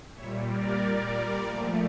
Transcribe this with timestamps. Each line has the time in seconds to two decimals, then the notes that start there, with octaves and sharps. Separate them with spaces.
0.14 A#2 G3 C#5 E5
0.47 A#4 D5
0.79 A#4 D5
1.45 A#2 F3 A3